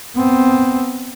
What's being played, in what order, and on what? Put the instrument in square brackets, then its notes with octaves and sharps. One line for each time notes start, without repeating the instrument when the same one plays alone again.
[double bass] B3 C4